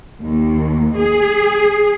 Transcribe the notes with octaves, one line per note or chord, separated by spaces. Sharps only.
D#2
G#4